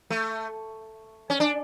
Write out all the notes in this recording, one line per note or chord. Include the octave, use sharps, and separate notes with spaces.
A3
C#4
D4